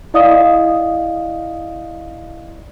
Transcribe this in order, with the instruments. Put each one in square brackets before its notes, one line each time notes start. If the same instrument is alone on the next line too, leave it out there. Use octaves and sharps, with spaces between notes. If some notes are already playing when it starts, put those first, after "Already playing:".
[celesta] E4 D5 D#5 F5 D#6